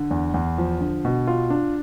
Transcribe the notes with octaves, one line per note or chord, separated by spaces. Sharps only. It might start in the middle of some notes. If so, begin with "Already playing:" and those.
Already playing: D3
E2
E2
F3
D3
B2
F4
D4